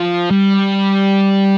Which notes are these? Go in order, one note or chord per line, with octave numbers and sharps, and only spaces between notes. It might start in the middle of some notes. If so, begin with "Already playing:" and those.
Already playing: F3
G3